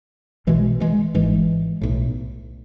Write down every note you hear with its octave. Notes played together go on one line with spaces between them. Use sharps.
B1 B2 E3 G#3
E3 G#3
G#1 G#2 E3 G#3
B1 A2